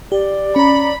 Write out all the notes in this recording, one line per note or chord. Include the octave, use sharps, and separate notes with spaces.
G4 D5
C#4 A#5 B5